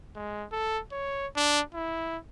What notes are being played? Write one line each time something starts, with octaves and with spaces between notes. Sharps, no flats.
G#3
A4
C#5
D4
E4